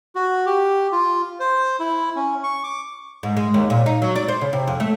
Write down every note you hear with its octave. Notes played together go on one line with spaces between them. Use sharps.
F#4
G4
F4
C5
E4
C#4
C#6
D6
G#2
G#3
D#2
A#2
D#4
F#3
D5
C5
C#3
C3
F2
A3